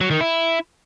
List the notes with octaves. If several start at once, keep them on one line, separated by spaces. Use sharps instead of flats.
F#3
D#3
E4